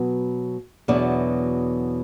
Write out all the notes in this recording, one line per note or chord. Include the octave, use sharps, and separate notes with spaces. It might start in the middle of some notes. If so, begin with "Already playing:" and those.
Already playing: B2 F#3 B3
E2 B2 F#3 D4 D5